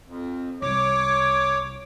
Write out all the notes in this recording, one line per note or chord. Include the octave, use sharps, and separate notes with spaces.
F2
C2 C#5 D6